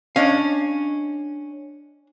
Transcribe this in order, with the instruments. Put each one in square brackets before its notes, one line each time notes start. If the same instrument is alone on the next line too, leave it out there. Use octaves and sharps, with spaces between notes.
[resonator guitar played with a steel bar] C#4 [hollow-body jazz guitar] D4 D#5 F5